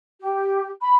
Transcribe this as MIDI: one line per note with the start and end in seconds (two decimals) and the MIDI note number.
0.19 0.70 67
0.80 0.97 83